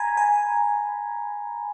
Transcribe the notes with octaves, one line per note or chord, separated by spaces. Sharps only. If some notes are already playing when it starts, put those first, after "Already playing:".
Already playing: G#5 A#5 B5
G#5